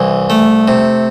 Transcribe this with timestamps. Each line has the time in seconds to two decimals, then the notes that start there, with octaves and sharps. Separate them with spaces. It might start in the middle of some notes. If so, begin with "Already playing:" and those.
Already playing: C2 E3
0.30 A3
0.68 C3